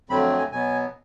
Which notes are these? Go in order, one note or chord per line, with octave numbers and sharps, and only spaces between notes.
F2 D3 F#3 A3 C4 B5
G#5
B2 F#3 B3 G#5